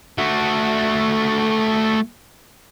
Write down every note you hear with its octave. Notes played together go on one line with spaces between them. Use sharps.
A3 F#4